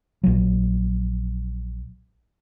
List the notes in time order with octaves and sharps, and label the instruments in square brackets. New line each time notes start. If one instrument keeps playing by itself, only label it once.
[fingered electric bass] A#1 F#3